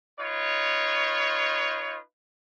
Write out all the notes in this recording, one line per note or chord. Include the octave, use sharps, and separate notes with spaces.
D#4 F4 B4 C#5